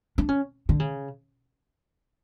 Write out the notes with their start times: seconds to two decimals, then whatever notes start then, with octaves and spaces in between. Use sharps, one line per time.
0.18 D4
0.29 C#4
0.69 D3
0.80 C#3